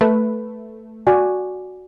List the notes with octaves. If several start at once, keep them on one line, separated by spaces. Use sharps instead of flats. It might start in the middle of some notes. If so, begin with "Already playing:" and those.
A3 B4
F#4 D5 G#5